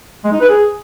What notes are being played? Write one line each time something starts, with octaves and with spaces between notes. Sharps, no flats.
G#3
D#4
B4
G#4